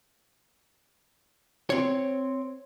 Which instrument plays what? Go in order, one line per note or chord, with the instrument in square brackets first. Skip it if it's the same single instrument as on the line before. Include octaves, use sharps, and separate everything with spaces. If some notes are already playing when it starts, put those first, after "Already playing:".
[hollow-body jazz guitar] C4 C#5